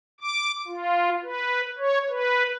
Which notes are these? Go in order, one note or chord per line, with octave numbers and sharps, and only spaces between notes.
D6
F4
B4
C#5
B4